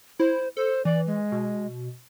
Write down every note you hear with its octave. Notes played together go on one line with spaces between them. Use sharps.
E4 C5
A4 C5
E3 D5
G#3
B2